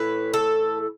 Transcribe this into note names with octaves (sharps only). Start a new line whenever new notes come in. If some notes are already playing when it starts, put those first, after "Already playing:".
Already playing: A2 E3 A3 B4
A4